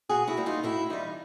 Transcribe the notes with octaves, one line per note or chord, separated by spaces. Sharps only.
B2 F#4 G#4
E4 F#4
G3 A#3
D#4 F4
A2 E4 F#4
E3 G3 D#4 F4